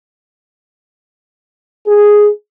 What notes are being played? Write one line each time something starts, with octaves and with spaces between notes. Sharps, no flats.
G#4